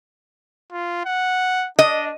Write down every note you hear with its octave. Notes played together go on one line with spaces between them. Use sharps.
F4
F#5
D4 D#5